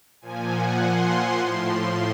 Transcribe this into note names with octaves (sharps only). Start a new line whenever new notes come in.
A#2 F3 G#5
F#5
C6
A2 F3 C6